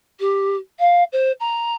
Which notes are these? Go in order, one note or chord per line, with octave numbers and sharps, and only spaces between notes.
G4
F5
C5
A#5